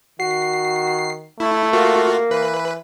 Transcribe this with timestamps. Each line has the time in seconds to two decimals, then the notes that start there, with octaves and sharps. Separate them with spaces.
0.20 D#3 F#4 C7
1.40 A3 E4
1.73 A#3 F4 F#4
2.31 E3 B4